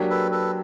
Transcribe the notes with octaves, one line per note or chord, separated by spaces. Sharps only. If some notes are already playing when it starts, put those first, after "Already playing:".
Already playing: F#3 A#3 D4 G4
A4 B4
A4 B4